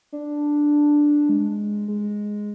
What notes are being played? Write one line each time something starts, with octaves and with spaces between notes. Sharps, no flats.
D4
G#3
G#3